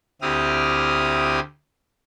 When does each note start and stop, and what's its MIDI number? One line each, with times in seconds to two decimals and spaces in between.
0.22 1.40 38
0.22 1.40 60
0.22 1.40 64
0.22 1.40 67
0.22 1.40 87
0.22 1.40 89